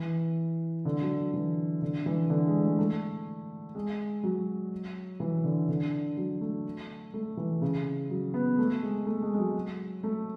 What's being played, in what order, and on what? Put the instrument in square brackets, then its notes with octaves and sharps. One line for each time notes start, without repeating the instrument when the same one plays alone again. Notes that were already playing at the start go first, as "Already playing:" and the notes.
Already playing: [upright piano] E3
D3
F#3
F#3
E3
D3
E3
D3
G#3
A3
A3
G#3
F#3
E3
D3
D3
F#3
A3
A3
E3
C#3
F#3
B3
A3
G#3
A3
G#3
G#3
F#3
A3